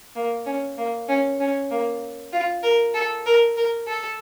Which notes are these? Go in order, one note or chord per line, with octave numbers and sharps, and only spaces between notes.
A#3
C#4
A#3
C#4
C#4
A#3
F4
A#4
A4
A#4
A#4
A4